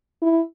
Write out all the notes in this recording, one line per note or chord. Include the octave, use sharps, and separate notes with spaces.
E4